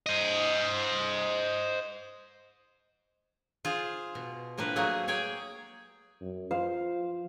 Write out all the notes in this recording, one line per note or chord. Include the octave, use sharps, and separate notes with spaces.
C5 D#5
F4 G#4 C5
B2
A2 F3 A#3 D4 B4
F#3 A3 A#3 F#4 G#4
G#4 C#5 G5 G#5
F#2
F3 C5 F5